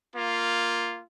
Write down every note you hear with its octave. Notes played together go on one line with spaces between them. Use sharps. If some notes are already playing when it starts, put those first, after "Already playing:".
A#3 F4